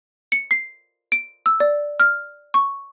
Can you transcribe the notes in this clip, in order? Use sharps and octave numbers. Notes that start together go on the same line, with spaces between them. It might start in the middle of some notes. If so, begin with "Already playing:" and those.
C#7
C7
D7
E6
D5
F6
C#6